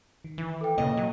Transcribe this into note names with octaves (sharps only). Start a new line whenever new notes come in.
D#3
E3
A4 F5 G5 D6
A#2 C#3 A#3 D#5
F#3